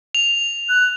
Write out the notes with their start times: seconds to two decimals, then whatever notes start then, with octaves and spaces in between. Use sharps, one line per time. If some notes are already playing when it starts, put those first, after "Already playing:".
0.15 F7
0.69 F#6